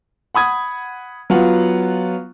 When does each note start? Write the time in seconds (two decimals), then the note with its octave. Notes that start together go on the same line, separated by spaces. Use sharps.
0.35 F#5 B5 D#6 G#6
1.30 F#3 B3 F4 F#5